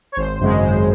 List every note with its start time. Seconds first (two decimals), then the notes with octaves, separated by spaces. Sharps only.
0.12 C#5
0.16 G#1 C5
0.40 F#2 C#3 G#3
0.62 G#1 C5